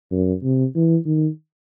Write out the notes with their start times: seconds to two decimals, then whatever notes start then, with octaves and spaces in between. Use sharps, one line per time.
0.11 F#2
0.43 C3
0.75 E3
1.06 D#3